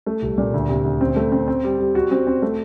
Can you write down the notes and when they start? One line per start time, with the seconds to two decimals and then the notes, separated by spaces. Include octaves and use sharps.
0.06 A3
0.22 C2
0.38 A#2
0.54 D2
0.69 C3
0.84 D2
1.01 C4
1.16 A3
1.32 C4
1.48 C4
1.64 G3
1.79 G3
1.95 F#4
2.11 C4
2.27 C4
2.42 A3